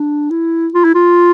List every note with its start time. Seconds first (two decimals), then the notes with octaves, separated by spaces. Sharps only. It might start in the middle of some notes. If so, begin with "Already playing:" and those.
Already playing: D4
0.31 E4
0.74 F4
0.84 E4
0.95 F4